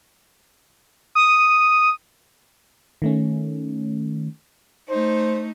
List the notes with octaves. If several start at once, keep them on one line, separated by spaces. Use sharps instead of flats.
D#6
D#3 A3 C#4
A3 D#4 C5